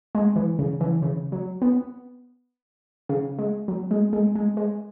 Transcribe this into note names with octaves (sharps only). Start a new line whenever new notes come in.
G#3
E3
C#3
E3
C#3
F#3
B3
C#3
G#3
F#3
G#3
G#3
G#3
G#3